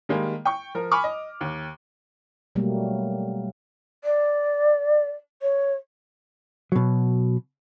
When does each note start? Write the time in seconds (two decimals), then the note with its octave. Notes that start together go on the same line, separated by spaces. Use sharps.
0.09 D#3 G3 G#3 A#3
0.45 G5 C#6
0.75 F3 A#4
0.91 G#5 B5 C#6 D6 F6
1.04 D#5
1.41 D#2
2.55 B2 F#3 G3 A3 A#3
4.04 D5
5.42 C#5
6.72 B2 F#3